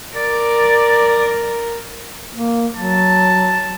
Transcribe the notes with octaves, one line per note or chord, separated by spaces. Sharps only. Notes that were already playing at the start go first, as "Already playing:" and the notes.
A#4 D5
A#3
F#3 A5